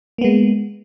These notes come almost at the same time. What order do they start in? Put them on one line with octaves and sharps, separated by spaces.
A#3 B3 G#3